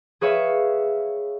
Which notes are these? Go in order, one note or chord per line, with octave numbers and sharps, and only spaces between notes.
G#4 B4 C#5 E5 F5 C#6